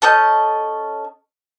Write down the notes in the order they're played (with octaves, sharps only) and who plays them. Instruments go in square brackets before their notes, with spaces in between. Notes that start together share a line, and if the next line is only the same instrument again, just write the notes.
[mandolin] C#4 A4 D#5 G6